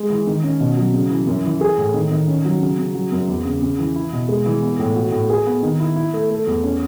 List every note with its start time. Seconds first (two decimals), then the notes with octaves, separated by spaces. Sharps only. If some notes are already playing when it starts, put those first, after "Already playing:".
Already playing: G#3
0.10 E3
0.27 D#3
0.43 C#4
0.60 B2
0.77 F#3
0.94 C#3
1.10 E3
1.27 F#2
1.45 E3
1.61 G#4
1.78 A2
1.94 D#3
2.11 D#3
2.27 C#4
2.45 F#3
2.61 C#3
2.78 C#3
2.94 F#3
3.12 F#2
3.28 E2
3.45 C#3
3.62 C#3
3.79 E3
3.96 E4
4.12 B2
4.29 G#3
4.46 E3
4.62 B3
4.79 A2
4.96 F#4
5.12 A2
5.30 G#4
5.47 B3
5.63 D#3
5.80 E4
5.96 E4
6.13 A3
6.30 A3
6.47 E2
6.64 C#4